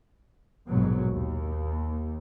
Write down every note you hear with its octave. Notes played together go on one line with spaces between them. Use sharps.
A#1 F2 G#2 B2 F#3
D#2